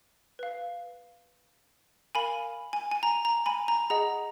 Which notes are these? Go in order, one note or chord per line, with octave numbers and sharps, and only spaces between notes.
B4 F5
A#4 F5 G#5 B5
G#5
G#5
A#5
A#5
G#5 B5
A#5
G#4 D#5 F#5 A#5